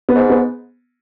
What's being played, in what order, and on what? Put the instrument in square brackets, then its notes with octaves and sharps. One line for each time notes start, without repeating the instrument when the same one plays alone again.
[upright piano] B3
[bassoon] G#2
[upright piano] B3